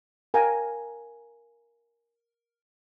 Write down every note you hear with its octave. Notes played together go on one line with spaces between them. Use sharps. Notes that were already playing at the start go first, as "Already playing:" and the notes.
A#4 F5 G5 G#5 A#5